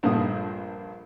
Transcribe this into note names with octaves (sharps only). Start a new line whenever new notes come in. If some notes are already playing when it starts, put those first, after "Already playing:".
A#1 G2 A#2 A3 D#6